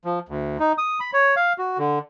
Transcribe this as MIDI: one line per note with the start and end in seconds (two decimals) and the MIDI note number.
0.05 0.19 53
0.29 0.57 38
0.59 0.72 63
0.78 1.00 87
1.00 1.11 83
1.13 1.35 73
1.36 1.53 77
1.58 1.78 66
1.78 1.99 50